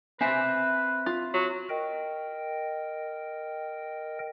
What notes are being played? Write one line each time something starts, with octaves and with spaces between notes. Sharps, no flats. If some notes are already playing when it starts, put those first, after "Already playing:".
C4 B4 C5 E5 G#5
F4
F#3
A#4 D#5 G5